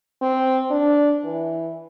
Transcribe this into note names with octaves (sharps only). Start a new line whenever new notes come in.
C4
D4
E3